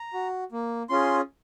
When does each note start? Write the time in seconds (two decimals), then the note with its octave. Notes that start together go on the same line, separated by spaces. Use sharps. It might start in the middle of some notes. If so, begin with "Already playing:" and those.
Already playing: A#5
0.13 F#4
0.52 A#3
0.89 C#4 F4 G#4 C6